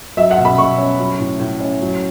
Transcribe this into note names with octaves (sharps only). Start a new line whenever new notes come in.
F#3 E5
F#5
B2
B5
B2 C#6
C#4
F#3
A2
A2
C#4
F#3